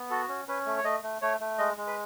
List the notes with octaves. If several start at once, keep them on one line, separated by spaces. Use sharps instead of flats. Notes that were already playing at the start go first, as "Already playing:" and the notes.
Already playing: B3
F#4 A4
C#4
C#4 B4
A3
C#5
A3 D#5
A3
A3 C#5
A3
G#3 D#5
G#3
B4